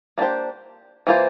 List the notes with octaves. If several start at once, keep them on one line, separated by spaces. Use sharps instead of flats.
A#3 D4 G4 C5
E3 A#3 F4 C5